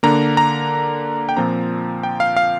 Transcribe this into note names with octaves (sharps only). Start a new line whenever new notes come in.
D3 A#3 D4 A#5
A#5
G5
A#2 F3 C4 A#5
G5
F5
F5